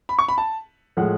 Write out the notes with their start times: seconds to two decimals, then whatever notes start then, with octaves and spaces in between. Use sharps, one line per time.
0.09 B5
0.19 C#6
0.28 B5
0.38 A5
0.97 A2 F3 G#3 F#5